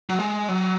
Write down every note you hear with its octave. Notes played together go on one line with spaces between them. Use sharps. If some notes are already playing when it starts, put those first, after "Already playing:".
F#3
G#3
F#3